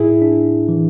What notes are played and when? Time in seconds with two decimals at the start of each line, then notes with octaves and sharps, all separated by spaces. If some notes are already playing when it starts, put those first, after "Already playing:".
Already playing: A2 E4 G#4
0.22 D4
0.69 E3